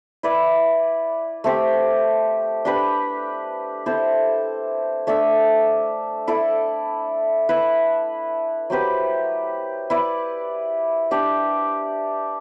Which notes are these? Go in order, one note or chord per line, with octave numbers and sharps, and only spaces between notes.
E4 B4 D5
A3 C4 G4
D4 G4 B4
C4 E4 A4 C5
A3 D4 A4 E5
E4 A4 D5
E4 B4 E5
F#3 C4 G4 B4
E4 B4 D5
D4 G4 D5